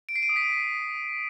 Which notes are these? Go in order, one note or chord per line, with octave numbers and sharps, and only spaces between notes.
D7
C7
D#7
D#6
B6